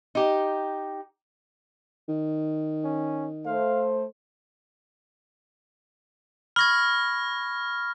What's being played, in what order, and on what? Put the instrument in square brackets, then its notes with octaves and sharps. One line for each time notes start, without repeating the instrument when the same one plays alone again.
[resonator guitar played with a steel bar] D#4 G4
[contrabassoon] D#3
[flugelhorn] C#4
[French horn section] A3 C5 [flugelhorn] F5
[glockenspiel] B5 C#6 G#6 [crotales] F6 A#6